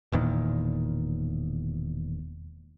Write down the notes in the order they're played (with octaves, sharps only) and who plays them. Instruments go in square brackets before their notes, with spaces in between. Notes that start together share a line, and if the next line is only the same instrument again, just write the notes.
[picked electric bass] E1 E2 A#2 D#3